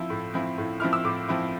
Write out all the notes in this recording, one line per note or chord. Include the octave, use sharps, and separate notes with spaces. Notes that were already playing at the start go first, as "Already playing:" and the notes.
Already playing: F3 C4 E4 E6
A2
F3 C4 E4
A2
F3 C4 E4 F6
E6
A2 D6
F3 C4 E4